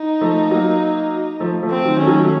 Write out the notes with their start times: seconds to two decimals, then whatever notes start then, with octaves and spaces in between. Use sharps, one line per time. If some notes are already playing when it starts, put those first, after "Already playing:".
Already playing: D#4
0.21 F3 A3
0.51 F#3 A#3
1.40 F3 A3
1.63 F3 A3
1.70 C4
1.85 D#3 F#3
1.99 A3 C#4
2.07 D#3 F#3
2.24 A3